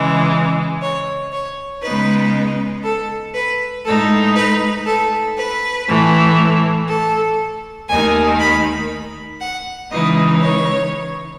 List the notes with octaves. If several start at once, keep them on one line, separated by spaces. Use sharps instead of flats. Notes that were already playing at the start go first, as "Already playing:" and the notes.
Already playing: C#3 E3 G#3
C#5
C#5
C#3 G#3 B3 D#4 B4
A4
B4
A2 G#3 D#4 A4
B4
A4
B4
A2 E3 A3
A4
D#2 D#3 A3 D#4 G#5
B5
F#5
C#3 E3 G#3 D#4 D#5
C#5